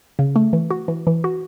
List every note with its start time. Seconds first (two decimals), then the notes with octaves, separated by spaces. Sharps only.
0.19 C#3
0.36 A3
0.53 E3
0.70 F#4
0.88 E3
1.07 E3
1.24 F#4